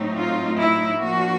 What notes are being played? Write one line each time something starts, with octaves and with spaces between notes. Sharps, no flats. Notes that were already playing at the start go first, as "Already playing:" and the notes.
Already playing: A2 F#3 A3 C4 D#4
F4
E4
F3 A#3 D4 F#4